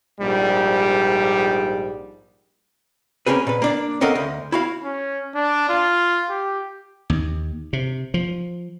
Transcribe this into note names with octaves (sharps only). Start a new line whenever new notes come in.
A#1 G#2 G3
A#3 C#4 D#4 F#4 G#4 B4
A#2 B4
A#3 D4 D5
C#4 A4 A#4 D#5 F5 F#5
D2
E4 F#4 F5
C#4
D4
F4
G4
D#2
C3
F3